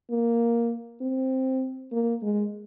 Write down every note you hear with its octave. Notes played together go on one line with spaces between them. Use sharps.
A#3
C4
A#3
G#3